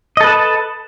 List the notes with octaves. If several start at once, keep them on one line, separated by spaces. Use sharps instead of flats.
A4 B4 D#5 A5